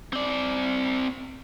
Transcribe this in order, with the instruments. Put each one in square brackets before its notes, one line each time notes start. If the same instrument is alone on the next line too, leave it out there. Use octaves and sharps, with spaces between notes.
[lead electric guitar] C4 D5